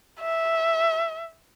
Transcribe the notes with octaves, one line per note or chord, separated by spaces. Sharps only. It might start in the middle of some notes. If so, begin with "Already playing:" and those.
E5